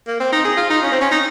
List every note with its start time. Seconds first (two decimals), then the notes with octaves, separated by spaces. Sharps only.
0.07 A#3
0.20 C4
0.32 D#4
0.44 G#4
0.57 F4
0.70 D#4
0.83 C#4
0.92 C4
1.01 C#4
1.12 D#4